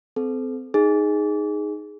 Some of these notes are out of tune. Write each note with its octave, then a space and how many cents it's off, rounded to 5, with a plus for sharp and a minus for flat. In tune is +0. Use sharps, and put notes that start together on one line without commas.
C4 -25 A4 -30
D#4 +0 G#4 +0